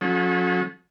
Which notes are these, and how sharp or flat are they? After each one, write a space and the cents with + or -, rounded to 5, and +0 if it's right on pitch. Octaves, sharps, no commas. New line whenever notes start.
F#3 -45 C#4 -20 A4 -25